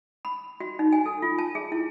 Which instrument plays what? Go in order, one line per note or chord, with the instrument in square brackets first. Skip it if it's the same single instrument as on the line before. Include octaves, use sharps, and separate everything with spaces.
[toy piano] B5
F#4
D#4
G#5
A4
F4
A5
G#4
E4